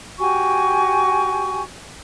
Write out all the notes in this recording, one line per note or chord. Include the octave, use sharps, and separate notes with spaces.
F#4 G4 G#5 C#6